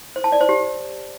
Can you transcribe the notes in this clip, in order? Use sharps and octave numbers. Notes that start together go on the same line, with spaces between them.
C5
A5
D5
C5
G4